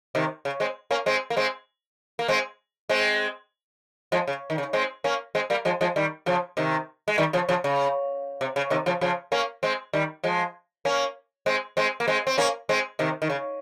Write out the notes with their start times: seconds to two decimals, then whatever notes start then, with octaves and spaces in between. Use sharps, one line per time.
0.15 C3 D#3
0.45 C#3
0.60 G#3 C4
0.91 A#3 C#4
1.06 G#3 C4
1.30 A#3
1.37 G#3 C4
2.19 A#3
2.28 G#3 C4
2.89 G#3 C4
4.12 F3 G#3
4.27 C#3
4.50 D#3
4.58 C#3
4.73 G#3 C4
5.04 A#3 C#4
5.35 G#3 C4
5.50 G3 A#3
5.65 F3 G#3
5.81 F3 G#3
5.96 D#3 G3
6.26 C#3 F3
6.57 C3 D#3
7.08 G#3
7.18 D#3 G3
7.33 C#3 F3
7.49 C#3 F3
7.64 C#3
8.41 C3
8.56 C#3
8.70 C3 D#3
8.86 C#3 F3
9.01 C#3 F3
9.32 A#3 C#4
9.63 G#3 C4
9.93 D#3 G3
10.24 F3 G#3
10.85 A#3 C#4
11.46 G#3 C4
11.77 G#3 C4
12.00 A#3
12.08 G#3 C4
12.27 C4
12.38 A#3 C#4
12.69 G#3 C4
12.99 C3 D#3
13.22 D#3
13.30 C#3